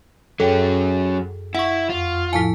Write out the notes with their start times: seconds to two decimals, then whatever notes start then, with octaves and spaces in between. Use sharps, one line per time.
0.40 F#2 F#3 C#4 G#4 A4 G5
1.55 E4 F#5 C#6
1.90 F2 F4
2.33 A2 F3 E4 G#5 A5 B6